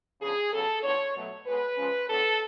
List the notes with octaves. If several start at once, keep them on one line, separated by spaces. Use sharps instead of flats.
C#3 F3 B3 D4 G#4
C#3 F#3 B3 A4
A2 F3 B3 D4 C#5
B2 F#3 A3
A2 G#3 B3 B4
F3 G#3 C#4
A2 F3 B3 D4 A4